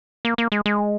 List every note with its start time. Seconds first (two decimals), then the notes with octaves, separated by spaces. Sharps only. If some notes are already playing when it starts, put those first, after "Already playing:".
0.25 A#3
0.38 A#3
0.52 G#3
0.66 G#3